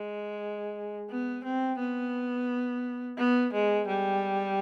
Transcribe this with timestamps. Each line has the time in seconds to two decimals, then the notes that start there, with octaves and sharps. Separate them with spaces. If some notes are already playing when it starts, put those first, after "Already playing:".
Already playing: G#3
1.10 B3
1.44 C4
1.79 B3
3.18 B3
3.53 G#3
3.87 G3